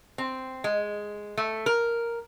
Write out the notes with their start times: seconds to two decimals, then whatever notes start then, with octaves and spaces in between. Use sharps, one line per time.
0.18 C4
0.64 G#3
1.37 A3
1.66 A#4